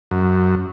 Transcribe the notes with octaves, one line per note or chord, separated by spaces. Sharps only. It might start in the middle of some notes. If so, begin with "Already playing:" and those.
F#2